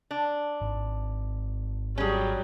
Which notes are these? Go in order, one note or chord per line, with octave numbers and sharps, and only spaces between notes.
D4
G#1
F#3 G3 C#4 G#4